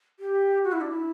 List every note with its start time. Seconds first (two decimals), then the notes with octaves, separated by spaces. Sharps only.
0.20 G4
0.64 F#4
0.72 E4
0.81 D4
0.90 E4